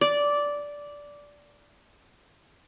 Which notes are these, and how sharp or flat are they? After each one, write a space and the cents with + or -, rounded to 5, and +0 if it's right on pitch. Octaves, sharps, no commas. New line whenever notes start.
D5 -10